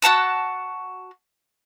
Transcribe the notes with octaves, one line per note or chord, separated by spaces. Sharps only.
F#4 F#5 A5 E6